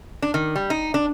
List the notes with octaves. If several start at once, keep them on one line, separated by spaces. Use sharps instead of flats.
D4
D#3
G3
D#4
D4